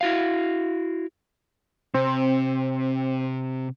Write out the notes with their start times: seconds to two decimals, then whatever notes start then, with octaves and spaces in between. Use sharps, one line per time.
0.01 E4 F#4 F5
1.94 C3 C4